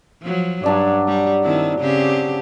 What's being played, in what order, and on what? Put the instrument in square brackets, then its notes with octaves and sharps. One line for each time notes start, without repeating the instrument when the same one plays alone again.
[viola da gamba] F3 F#3
[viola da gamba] G2 [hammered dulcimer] F#3 D4 D5
[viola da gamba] G3
D#3 C4 E4
C#3 C4 G4